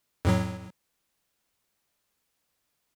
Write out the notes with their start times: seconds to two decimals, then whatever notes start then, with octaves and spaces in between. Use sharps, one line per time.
0.25 F2 A2 F#3